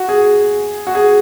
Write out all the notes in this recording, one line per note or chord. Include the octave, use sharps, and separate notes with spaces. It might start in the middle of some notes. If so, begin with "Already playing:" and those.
Already playing: F#4
G#4
F#4
G#4